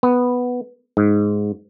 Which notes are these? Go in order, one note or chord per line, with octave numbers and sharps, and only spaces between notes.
B3
G#2